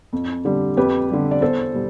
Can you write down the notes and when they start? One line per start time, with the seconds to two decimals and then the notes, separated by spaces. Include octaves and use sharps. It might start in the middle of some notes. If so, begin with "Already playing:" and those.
0.13 F2
0.45 D3 G3
0.77 F2 G4 B4
1.10 D3 G3
1.31 D5
1.42 E2 A4 C5
1.74 B2 G3